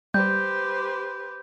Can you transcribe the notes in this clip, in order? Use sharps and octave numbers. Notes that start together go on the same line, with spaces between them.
G3 G4 B4 C5 G6